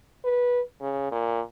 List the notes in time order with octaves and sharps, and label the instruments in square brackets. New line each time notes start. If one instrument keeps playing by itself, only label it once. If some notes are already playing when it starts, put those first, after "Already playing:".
[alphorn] B4
C#3
A#2